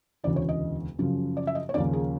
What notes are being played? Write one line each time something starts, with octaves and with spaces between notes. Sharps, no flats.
E1 D2 C#3 E3 D5
C#5
D#5
F#2 C#3 F3
D5
E5
D#5
C#5
D#2 C#3 F3 A#3 C#4 D5
G#4